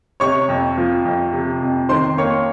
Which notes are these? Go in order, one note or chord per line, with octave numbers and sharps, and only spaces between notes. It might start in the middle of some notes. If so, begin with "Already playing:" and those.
C3 C#5 C#6
F2
F3
F2
C3
F2
D#3 C5 C6
A#3 C#5 C#6